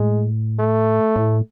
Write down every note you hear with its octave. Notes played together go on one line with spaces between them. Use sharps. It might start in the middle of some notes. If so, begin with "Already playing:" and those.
Already playing: A2 G#3
A3
A2